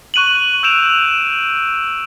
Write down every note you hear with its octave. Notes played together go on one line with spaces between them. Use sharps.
C#6 F#6 D#7 F7 F#7
E6 G6 D7 E7 F7